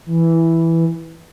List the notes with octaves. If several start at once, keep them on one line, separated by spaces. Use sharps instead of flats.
E3